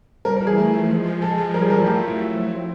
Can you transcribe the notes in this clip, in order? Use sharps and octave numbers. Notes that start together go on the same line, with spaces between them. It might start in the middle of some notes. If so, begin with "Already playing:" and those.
G3 A#4
E3 A#4
G#4
A3
F3
G#3
F3
G#3 A4
F3
G3 A#4
G#4
E3 A#4
A4
A3 G4
F4
F#3
E4
A3
F3
C4